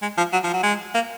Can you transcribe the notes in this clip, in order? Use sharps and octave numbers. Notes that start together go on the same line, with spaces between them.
G#3
F3
F#3
F3
F#3
G#3
A#3